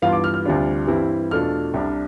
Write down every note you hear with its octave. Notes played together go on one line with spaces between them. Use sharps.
G2 E3 B3 F4 F5
C6
D6
F6
F6
D2 C3 G3 D4 F4
G2 E3 G3 C4 E4
E2 B2 A3 D4 F4 F6
C2 C3 G3 D4